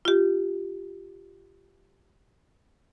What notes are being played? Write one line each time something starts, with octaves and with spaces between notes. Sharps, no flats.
F4 G4